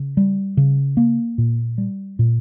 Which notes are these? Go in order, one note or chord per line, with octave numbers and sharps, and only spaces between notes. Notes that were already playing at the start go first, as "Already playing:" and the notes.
Already playing: C#3
G3
C#3
A#3
A#2
G3
A#2